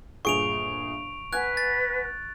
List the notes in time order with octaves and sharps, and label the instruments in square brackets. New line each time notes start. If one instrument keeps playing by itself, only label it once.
[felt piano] G1 A#2 G#4 [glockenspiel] C#6 D7 F7
[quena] B4 [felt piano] F#5 G#5 G#6 [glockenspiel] F#6
[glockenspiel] A6